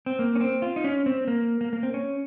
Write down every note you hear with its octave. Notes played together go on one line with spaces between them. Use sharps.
C4
A#3
C#4
C4
F4
D#4
C#4
C4
A#3
A#3
A#3
C4
C#4